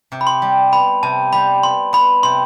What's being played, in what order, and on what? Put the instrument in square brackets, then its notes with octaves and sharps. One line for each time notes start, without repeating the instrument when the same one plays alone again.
[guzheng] C3
[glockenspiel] B5
C6
[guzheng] G3
[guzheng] B3 [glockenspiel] B5
[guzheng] C3 [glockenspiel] A5
[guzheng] G3 [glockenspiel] B5
[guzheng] B3 [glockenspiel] C6
[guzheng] B3 [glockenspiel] B5
[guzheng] C3 [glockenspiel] C6